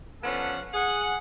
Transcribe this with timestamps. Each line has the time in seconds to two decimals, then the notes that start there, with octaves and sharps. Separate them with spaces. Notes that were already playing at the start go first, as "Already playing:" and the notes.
0.23 F3 B3 C#4 D4 A4 F#5
0.73 G#4 F#5